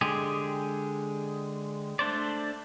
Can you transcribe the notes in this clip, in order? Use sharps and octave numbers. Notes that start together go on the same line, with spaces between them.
D3 G#3 G4 G#4
A3 D4 C5 D5